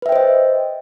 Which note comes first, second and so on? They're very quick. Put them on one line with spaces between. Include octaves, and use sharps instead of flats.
B4 E5 G5 C5 D#5